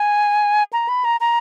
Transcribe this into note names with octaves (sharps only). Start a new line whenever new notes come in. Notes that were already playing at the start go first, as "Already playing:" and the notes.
Already playing: G#5
A#5
B5
A#5
A#5